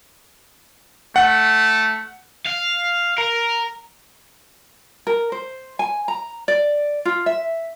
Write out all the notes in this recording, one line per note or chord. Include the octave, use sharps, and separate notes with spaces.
A3 F#5
F5
A#4
A#4
C5
G#5
A#5
D5
F4
E5